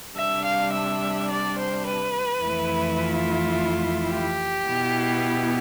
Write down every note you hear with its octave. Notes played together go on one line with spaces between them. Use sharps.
C3 G3 D4 E5
F5
E5
D5
C5
B4
F2 E3 A3 E4
F4
G4
B2 B3 E4